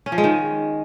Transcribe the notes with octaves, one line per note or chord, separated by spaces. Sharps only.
C#4
F3
G#3
D#3